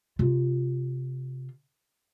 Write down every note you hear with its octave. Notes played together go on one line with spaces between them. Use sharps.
C3 F4